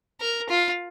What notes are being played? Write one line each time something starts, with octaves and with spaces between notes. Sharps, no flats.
A#4
F4